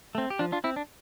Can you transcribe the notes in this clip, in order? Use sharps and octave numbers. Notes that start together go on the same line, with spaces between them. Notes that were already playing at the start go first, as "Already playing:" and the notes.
A3 C4
G4
F3 D4 F4
D4 F4
C4 E4
D4